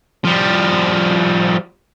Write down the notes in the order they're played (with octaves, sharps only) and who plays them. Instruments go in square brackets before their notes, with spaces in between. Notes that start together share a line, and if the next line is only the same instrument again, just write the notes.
[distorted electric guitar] F3 G3